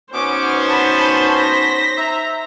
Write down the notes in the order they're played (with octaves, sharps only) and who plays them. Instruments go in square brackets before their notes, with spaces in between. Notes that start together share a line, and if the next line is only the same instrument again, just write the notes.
[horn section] B2 B3 C#4 [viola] D#4 C5 [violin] D6
[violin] A5 B5
A#6 B6
[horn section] E5 A#5